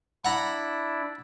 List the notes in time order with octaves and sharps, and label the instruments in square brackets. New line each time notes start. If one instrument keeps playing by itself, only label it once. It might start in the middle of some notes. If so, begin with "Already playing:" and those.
[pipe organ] D4 E4 [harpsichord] F#5 A#5 B5